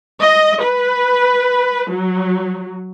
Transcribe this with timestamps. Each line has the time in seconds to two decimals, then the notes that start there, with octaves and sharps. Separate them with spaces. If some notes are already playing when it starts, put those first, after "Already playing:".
0.23 D#5
0.63 B4
1.91 F#3